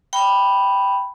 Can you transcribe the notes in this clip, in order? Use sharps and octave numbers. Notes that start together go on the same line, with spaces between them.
G5 B5